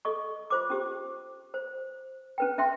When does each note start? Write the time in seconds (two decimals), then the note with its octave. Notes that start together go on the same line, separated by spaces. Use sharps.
0.05 A4 D#5 C#6
0.50 F4 C5 D6
0.70 C#4 G4
1.54 C5
2.38 C#4 B4 G5
2.58 C#4 E5 G5 C6